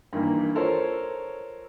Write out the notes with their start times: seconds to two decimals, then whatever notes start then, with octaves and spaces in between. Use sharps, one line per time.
0.13 G2 D#3 E3 A#3
0.55 F4 A4 A#4 C5 C#5